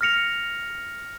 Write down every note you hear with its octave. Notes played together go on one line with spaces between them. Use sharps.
F6 A#6 C#7 F7